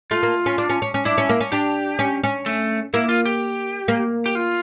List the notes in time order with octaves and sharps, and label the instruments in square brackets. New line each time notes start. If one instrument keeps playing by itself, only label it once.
[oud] A3 [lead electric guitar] F4
[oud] A#3
C#4
D4
C#4
C#4
C#4
[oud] D4 [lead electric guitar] E4
[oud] C#4
A#3
C#4
[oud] D4 [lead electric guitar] G4
[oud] C#4
C#4
[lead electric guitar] A3
[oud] A#3 [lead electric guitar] E4
[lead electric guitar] F4
G4
[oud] A#3
[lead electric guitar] G4
F4